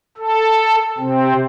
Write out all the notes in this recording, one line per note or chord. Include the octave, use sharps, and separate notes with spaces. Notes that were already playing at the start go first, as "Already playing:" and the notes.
A4
C3 C4